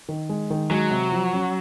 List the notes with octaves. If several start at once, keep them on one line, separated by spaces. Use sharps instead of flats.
D#3
G#3
D#3
F#3 G#3
C3
F3
C#4